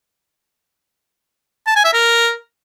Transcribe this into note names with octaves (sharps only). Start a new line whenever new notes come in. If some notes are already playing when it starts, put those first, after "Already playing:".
A5
G#5
E5
A#4